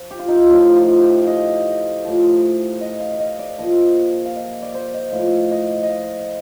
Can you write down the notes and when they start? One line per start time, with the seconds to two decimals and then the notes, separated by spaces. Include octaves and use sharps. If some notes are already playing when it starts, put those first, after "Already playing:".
Already playing: F3
0.11 G4
0.19 F4
0.28 D#4
0.36 F4
0.50 A2 F3 D#4
0.76 F4
1.02 G4
1.22 F5
1.27 D#5
2.04 A2 F3
2.81 D#5
3.00 F5
3.13 F5
3.20 D#5
3.39 D5
3.58 A#2 F3 D#5
4.26 F5
4.36 D#5
4.62 D5
4.74 C5
4.94 D#5
5.12 A2 F3 F5
5.51 D#5
5.83 D#5
5.89 F5